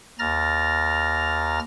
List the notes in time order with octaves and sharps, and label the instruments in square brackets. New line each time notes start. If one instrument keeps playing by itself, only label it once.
[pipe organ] D#2 A#5 F6 A6 A#6